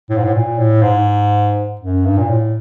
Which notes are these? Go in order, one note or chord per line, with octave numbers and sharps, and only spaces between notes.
A2
G#2
A2
A#2
A2
G#2
F#2
G2
A#2
A2